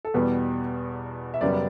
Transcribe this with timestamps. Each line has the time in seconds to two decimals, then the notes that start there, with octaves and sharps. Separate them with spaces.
0.05 A4
0.14 E2 B2 G3 B4
1.34 E5
1.41 F#2 C#3 G3 B3 D5